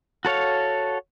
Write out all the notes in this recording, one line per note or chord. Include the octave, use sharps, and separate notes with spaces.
F#4 A4 C#5 F5